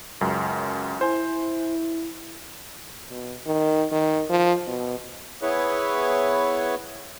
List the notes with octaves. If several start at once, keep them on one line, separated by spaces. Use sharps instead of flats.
C#2 F#2
E4 C5 G#5
B2
D#3
D#3
F3
B2
B3 E4 G#4 B4 C#5